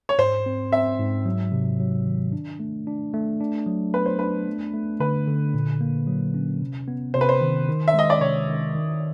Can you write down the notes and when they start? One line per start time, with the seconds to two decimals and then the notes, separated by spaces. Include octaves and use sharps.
0.09 C#5
0.18 G#2 C5
0.46 C4
0.72 C4 E5
0.99 G#2
1.26 F#3
1.52 C3
1.80 F#3
2.06 D#3
2.33 D4
2.60 A3
2.87 D4
3.14 A3
3.40 D4
3.66 F#3
3.93 B3 B4
4.06 C5
4.19 D4 B4
4.47 A3
4.74 A3
5.00 D3 B4
5.27 D3
5.54 A#2
5.81 A#3
6.07 F#3
6.34 C#4
6.61 C3
6.88 B3
7.14 C3 C5
7.21 B4
7.29 C5
7.41 D#3
7.68 D#3
7.88 E5
7.94 G#3 D#5
8.10 D5
8.21 C3 C#5
8.48 D#3
8.75 D#3